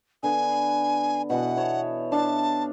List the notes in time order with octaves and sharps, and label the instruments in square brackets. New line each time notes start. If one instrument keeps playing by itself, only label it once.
[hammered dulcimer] D3 B3 [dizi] G#5
[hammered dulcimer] B2 E3 B3 [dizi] F#5
[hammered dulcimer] B3 C#5 A5
[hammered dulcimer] D4 E5 F5 [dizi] A5